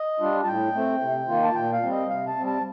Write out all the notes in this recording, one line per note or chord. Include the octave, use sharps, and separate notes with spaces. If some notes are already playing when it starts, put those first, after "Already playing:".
Already playing: D#5
G3 D4 F4
A5
A2 G5
A3 C4
C3
D#3 A#3 F4
A5
A#2 G5
F5
G3 C4
D#5
C3 F5
A5
G3 C4
A5